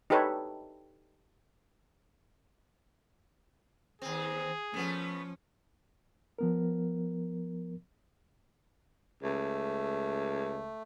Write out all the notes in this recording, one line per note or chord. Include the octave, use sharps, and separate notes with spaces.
D#4 G4 A4 B4 C#5
D#2 C4 G#4
F3 A3 B3 C#4
F3 B3 A#4
C#2 A3